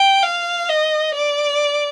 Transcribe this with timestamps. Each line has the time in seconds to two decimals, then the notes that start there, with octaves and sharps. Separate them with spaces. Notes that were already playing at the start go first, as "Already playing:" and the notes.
Already playing: G5
0.23 F5
0.69 D#5
1.15 D5